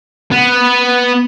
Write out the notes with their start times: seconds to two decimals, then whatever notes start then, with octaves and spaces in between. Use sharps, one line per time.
0.32 B3